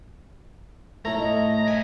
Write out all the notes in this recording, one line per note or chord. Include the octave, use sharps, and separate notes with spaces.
A2 A3 A#5
D#5
A#4 E5 G#5